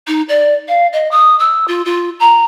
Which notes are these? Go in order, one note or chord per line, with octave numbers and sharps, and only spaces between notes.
D#4
D5
F5
D#5
D#6
E6
F4
F4
A#5